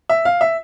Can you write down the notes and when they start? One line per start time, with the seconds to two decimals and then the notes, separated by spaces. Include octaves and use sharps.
0.09 E5
0.25 F5
0.41 E5